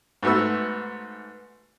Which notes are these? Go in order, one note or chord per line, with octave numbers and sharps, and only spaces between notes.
G#2 A3 B3 F#4 E6